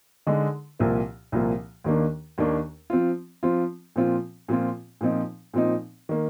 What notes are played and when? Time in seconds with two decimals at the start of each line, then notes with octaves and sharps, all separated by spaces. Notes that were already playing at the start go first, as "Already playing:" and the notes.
0.27 D3 G#3 D#4
0.79 C2 A#2 F3 A#3
1.32 C2 A#2 F3 A#3
1.84 D#2 D#3 A#3 D4
2.38 D#2 D#3 A#3 D4
2.90 F3 C4 F4
3.43 F3 C4 F4
3.96 A#2 F3 C4 F4
4.49 A#2 F3 C4 F4
5.01 A#2 F3 C4 D#4
5.54 A#2 F3 C4 D#4
6.09 D#3 A#3